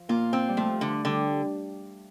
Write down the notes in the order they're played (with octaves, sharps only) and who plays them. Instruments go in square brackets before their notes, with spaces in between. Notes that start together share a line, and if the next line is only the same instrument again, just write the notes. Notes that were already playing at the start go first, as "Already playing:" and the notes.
Already playing: [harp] F3
[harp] A#2 A#3 [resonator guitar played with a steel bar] F4
[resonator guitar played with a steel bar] C4
[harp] G3
[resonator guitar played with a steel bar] F3 [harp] A3
[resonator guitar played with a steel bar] D3
[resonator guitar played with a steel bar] D3 [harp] G3